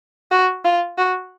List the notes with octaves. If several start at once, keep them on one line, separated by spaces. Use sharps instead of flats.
F#4
F4
F#4